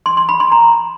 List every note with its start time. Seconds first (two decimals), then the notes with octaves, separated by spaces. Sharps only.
0.06 C6
0.17 C6
0.29 B5
0.40 C6
0.52 A#5